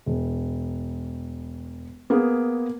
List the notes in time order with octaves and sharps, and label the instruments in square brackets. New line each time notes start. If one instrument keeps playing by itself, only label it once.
[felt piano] E1
A#3 B3 G#4